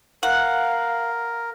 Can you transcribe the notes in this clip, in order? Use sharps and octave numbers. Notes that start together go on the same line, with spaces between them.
A#4 F5 F#5